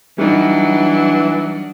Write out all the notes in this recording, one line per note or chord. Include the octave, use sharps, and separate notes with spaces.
E3 F#3 G3 D4 D#4